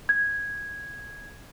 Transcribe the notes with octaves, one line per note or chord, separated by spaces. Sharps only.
G#6